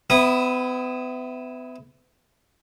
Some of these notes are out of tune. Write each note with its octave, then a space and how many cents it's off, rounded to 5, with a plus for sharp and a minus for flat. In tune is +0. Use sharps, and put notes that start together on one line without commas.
B3 +40 E4 +0 D#6 -10